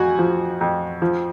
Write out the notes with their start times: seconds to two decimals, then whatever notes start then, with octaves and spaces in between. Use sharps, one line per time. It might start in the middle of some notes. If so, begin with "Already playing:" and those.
Already playing: F2 F#4 F#5 G#5
0.19 F3
0.61 F2
1.02 F3